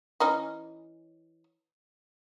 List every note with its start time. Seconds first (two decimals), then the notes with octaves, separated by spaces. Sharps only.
0.20 E3 C#4 D#4